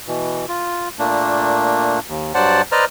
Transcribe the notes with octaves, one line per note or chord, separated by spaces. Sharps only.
B2 E3
F4
A#2 A3 A#3 D4
D#2
G2 F#3 C5 D5 F#5 A5
B4 C5 D5 D#5 A#5 F6